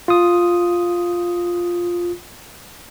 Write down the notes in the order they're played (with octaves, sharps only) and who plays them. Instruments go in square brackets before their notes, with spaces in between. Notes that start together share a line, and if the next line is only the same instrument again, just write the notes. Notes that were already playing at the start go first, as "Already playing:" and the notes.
[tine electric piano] F4 D#6